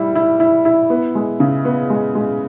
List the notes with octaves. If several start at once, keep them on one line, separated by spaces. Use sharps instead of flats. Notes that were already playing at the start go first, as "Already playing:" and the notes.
Already playing: G3 E4
E4
E4
E4
B3
G#3
C#3
B3
G#3
G#3